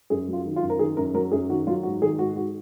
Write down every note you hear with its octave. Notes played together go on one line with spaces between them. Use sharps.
F#2 G#4
F#3 F4
D#3
F4
F#2
A#4
D#3 G#4
F#2 A#4
F#3 A#4
F#2 G#4
D#3 F#4
F#3 F4
G#2 F#4
D#3 G#4
G#2 F#4
G#2 F#4